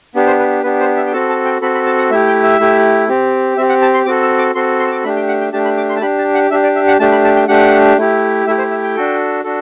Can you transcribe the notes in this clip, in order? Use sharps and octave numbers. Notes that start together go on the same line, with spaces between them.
B3 D4 G4
C5
B4
B3 D4 G4 B4
C5
E5
G5
C4 F#4 A4 A5
A5
G5
C4 F#4 A4 B5
B5
A5
F#5
A3 E4 G4 E5
G5
E5
A3 E4 G4
C4 G4
C4 G4 E5
F#5
A5
C6
C4 F#4 A4 D6
E6
D6
C4 F#4 A4 C6
C6
E6
D6
A3 D4 G4 B5
G5
F#5
G5
A3 D4 G4 A5
B5
D6
C6
A5
D4 G4 B5
A5
F#5
D4 G4 E5
D5
E5
F#5
A3 D4 G4 A5
B5
A5
G5
A3 D4 G4 F#5
A3 E4 G4
A3 E4 G4 E5
C5
E5
G5
D4 F#4 A4
D4 F#4 A4